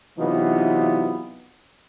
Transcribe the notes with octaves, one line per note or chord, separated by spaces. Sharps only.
C3 E3 F#3 B3 D#4 F4